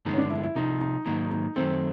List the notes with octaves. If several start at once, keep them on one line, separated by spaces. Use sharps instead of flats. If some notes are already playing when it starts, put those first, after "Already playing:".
G2 D3 F3 G#3 B3 D#4
C#4
D4
E4
E4
C2 C3 F3 D#4
D#4
G#2 D#3 F#3 A#3 D#4
D#4
F#2 D#3 F#3 A3 C4